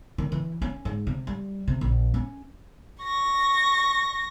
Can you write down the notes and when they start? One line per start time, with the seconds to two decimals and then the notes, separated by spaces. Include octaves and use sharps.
0.18 D#3
0.32 E3
0.62 C#4
0.85 G#2
1.07 C3
1.27 G3
1.68 C3
1.81 A#1
2.14 C#4
3.03 C#6 A#6